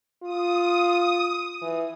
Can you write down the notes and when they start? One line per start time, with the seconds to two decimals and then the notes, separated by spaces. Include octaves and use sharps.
0.23 F4 D#6
1.61 E3